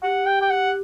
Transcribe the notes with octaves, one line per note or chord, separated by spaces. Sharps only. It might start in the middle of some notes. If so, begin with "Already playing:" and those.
G4 F#5
G5
G5
F#5